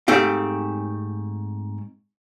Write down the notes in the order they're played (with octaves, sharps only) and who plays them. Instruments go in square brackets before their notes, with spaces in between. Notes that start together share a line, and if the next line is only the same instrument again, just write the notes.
[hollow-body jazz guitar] G#2 A3 C4 G4 F5